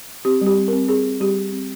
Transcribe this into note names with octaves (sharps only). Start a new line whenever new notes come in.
C4 G4
G3
G4
C4
C4 A#4
C4 G#4
C4
G3 G4
G3
C4